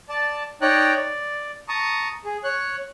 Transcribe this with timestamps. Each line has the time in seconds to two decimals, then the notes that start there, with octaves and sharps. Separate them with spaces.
0.09 D5 A5
0.62 D#4 C#5 D5 G5 A#5 F#6
0.96 D5
1.68 A5 A#5 C#6 D#6
2.25 G#4
2.44 C#5 F#6